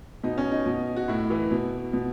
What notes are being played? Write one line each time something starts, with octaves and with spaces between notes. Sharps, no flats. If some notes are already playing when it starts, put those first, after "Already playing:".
B2 D#4
C#4
D#4
B2
F#4
A2 E4
E3
B2
B2